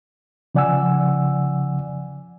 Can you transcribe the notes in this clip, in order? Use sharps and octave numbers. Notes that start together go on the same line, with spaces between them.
C#3 F3 D5 F#5 G#5 E6